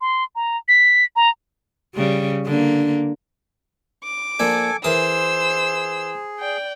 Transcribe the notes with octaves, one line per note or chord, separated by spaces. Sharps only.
C6
A#5
B6
A#5
C#3 G3
D3 A#3
D6
F3 A#3 D4 A4 G#5
E3 G#4 A#4 C5 D#6 E6
D5 G5